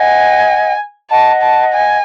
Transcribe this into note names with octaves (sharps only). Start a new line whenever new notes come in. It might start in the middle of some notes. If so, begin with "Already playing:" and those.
Already playing: D#5 F#5 G#5
D#5 F#5 A5
A5
G#5